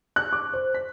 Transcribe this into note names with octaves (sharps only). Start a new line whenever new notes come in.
F#6
D6
C5
B6